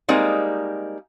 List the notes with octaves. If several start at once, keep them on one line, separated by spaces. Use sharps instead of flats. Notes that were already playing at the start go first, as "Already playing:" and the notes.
G3 G#3 A#3 C4 D#4